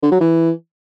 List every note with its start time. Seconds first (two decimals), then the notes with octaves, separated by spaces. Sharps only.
0.02 D3
0.11 F#3
0.20 E3